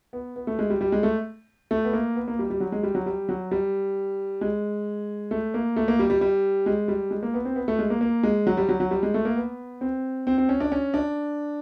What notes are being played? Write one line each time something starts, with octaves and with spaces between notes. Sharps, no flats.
B3
B3
A3
G#3
G3
G3
G#3
A3
A3
B3
A#3
B3
A#3
G3
G3
F#3
G#3
G3
F#3
G3
F#3
G3
G#3
A3
A#3
A3
A#3
G3
G3
G3
G#3
G3
G#3
A#3
B3
C4
B3
A3
G#3
A#3
A#3
G#3
F#3
G3
F#3
F#3
G3
G#3
A3
A#3
B3
C4
C4
C4
C#4
D4
C#4
D4